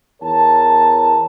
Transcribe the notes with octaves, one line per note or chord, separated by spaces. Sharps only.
E2 A#4 C#5 A5